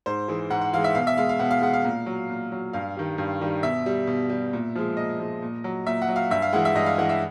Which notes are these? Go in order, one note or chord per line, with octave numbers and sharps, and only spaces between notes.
G#2 C5
E3 G#3
G#2 F#5
F#5
E3 G#3 F5
E5
B2 F5
E5
G#3 F5
F5
B2 F#5
F5
G#3 F#5
F5
A#2
F#3
A#2
F#3
G2 F5
D#3 G3
G2
D#3 G3
B2 E5
G3
B2
G3
A#2
F3 G#3
A#2 D#5
F3 G#3
A#2
F#3
A#2 E5
F#5
F#3
F5
G2 E5
F5
E3 G#3 F#5
E5
G2 D#5
F5
E3 G#3 F#5
E5